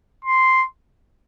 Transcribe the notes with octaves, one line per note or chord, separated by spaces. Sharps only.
C6